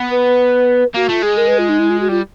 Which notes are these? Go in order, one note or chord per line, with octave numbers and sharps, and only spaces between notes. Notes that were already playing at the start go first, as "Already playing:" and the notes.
Already playing: B3
B4
A#3 F#4
A3 F4
G#3 G#4
A#4
B4
F4
D#4
E4
F4
F#4
G3 F4